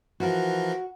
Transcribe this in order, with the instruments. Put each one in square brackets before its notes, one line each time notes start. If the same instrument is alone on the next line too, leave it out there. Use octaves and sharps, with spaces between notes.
[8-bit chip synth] E3 F3 A#4 [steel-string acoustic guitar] F#4